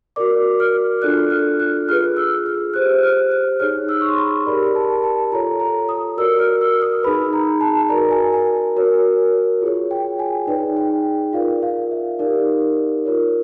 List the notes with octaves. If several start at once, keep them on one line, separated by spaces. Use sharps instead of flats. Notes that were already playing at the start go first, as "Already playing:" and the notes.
F#4 A#4 D5 D6
F6
D4 F4 A4 D5 F#6
F6
F#6
F4 G#4 B4 F6
E6
F6
G4 C5 F#6
F6
F#6
D#4 G#4 C#5 F6
E6
C#6
C6
B5
G4 A#4 D5 B5
A5
A5
F4 A4 C#5 A#5
A#5
D#6
F#4 A#4 D5 E6
F6
E6
D#6
D#4 G#4 B4 B5
A#5
A5
F#4 A#4 D5 A#5
G#5
G#5
F#4 A#4 C#5
F4 G#4 C#5
G5
G#5
D#4 G#4 B4 D5 G5
G5
F4 A#4 D5 F5
F5
E5
D#4 G4 A#4 D5
F4 A#4 C#5